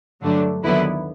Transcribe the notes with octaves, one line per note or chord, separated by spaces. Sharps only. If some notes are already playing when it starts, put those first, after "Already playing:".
G2 D3 F#3 A3 D4
D#2 D3 F#3 B3 E4